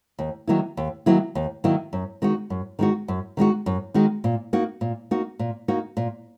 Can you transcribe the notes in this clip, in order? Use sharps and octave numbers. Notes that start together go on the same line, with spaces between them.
D#2
D#3 F#3 A#3 E4
D#2
D#3 F#3 A#3 E4
D#2
D#3 F#3 A#3 E4
F#2
D#3 G#3 D#4 F#4
F#2
D#3 G#3 D#4 F#4
F#2
D#3 G#3 D#4 F#4
F#2
D#3 G#3 D#4 F#4
A#2
A#3 D#4 F#4
A#2
A#3 D#4 F#4
A#2
A#3 D#4 F#4
A#2